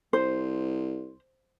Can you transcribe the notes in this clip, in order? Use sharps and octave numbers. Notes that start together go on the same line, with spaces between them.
C2 C5